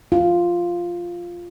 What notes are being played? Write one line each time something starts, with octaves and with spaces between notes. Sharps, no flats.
F4